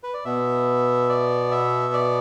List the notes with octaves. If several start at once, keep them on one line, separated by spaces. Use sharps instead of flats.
B4
D5
B2 B3 E5
D5
E5
D5